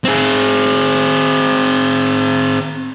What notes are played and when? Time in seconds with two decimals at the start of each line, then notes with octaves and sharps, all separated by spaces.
0.04 C4 G#4